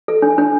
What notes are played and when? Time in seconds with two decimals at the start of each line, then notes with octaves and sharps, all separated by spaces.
0.08 A4
0.22 D4
0.38 D4